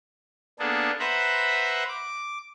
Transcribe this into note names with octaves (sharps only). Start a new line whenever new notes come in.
A#3 B3 D4 G#4 A4
B4 C5 E5 F#5 A#5 B5
D6